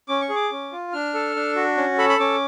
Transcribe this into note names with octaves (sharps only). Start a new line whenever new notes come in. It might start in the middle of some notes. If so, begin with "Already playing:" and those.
C#4 D6
C#6
G#4
D6
C#4
F4
D4 F6
A4
D4
F#4
C#4
A4 B5
B5
C#4 D6